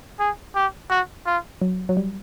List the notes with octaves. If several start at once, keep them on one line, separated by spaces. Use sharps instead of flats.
G#4
G4
F#4
F4
F#3
F#3
G3